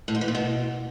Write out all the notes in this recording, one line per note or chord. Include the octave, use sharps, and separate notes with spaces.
A2
G#2
E3
A#2
B2